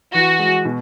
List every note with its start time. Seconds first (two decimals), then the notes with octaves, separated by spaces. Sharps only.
0.14 E3 F#4
0.39 G#3
0.65 B2